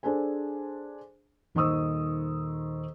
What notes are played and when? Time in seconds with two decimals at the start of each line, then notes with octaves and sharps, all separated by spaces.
0.03 D4 G#4 A4 C5 G#5
1.55 D#1 D#3 C5 C#6 D#6 E6